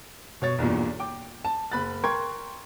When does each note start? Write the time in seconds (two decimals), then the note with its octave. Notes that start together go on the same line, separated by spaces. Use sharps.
0.42 B2 C#5 A6
0.58 B1 E2 G2 A#2
1.00 G5 D6
1.45 A5
1.72 F#1 B5 F#6 A6
2.04 A#4 G5 C6 C#6 G#6